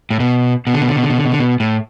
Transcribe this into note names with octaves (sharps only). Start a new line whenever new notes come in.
A2
B2
B2
D3
B2
D3
B2
D3
B2
D3
B2
D3
B2
A2